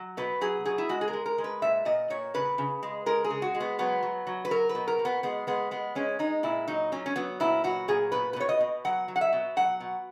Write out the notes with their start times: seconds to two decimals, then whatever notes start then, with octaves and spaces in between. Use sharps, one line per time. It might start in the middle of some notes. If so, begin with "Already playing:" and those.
Already playing: F#3
0.17 B2 B4
0.41 F#3 G#4
0.65 B2 G#4
0.78 E4
0.89 G#3 F#4
1.01 G#4
1.08 A#4
1.13 G#3
1.26 A#4
1.38 G#3
1.44 B4
1.62 A#2 E5
1.85 A#2 D#5
2.10 A#2 C#5
2.34 C#3 B4
2.58 C#3
2.83 G#3
3.06 G#3 A#4
3.24 G#4
3.30 C#3
3.42 F#4
3.55 G#3
3.60 B3
3.79 F#3 B3
4.03 F#3
4.27 F#3
4.45 B4
4.51 F#3 A#4
4.69 B4
4.75 B2
4.88 A#4
4.99 B2
5.05 B3
5.23 G#3 B3
5.47 G#3 B3
5.71 G#3 B3
5.95 G#3 C#4
6.19 G#3 D#4
6.43 A#2 E4
6.68 F#3 D#4
6.92 F#3 C#4
7.06 C#4
7.16 F#3 B3
7.40 A#2 E4
7.64 F#3 F#4
7.88 A#2 G#4
8.12 B2 B4
8.33 B4
8.36 B2 C#5
8.49 D#5
8.60 B2
8.85 F#3 F#5
9.08 F#3
9.16 F#5
9.21 E5
9.33 B2
9.56 F#3 F#5
9.80 B2